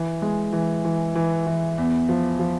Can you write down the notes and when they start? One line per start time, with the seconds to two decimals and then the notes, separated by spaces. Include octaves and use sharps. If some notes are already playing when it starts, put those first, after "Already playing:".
Already playing: E3
0.22 G#3
0.53 E3
0.85 E3
1.15 E3
1.46 E3
1.78 E2
2.09 F3
2.39 F3